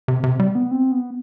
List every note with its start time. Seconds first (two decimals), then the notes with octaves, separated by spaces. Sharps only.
0.08 C3
0.24 C3
0.40 G3
0.55 B3
0.71 C4
0.92 B3